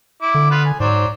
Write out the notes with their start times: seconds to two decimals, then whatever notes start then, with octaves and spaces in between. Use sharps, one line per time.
0.22 E4 D6
0.34 D3
0.51 B3 F4 B4
0.65 G#5
0.80 G#2 F#3 C5 D5